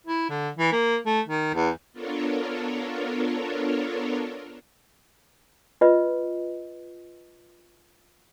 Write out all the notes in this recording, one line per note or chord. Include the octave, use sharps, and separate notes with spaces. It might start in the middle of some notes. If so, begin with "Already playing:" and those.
E4
D3
E3
A#3
A3
D#3
E2
B3 D4 F4 A4 A#4 C#5
F4 B4 D#5